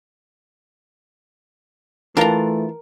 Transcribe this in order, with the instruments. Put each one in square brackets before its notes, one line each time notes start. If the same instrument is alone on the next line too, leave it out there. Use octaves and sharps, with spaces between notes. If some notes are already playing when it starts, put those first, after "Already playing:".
[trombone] E3 [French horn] A3 [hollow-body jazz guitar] D4 F4 A5 [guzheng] A#4 A#5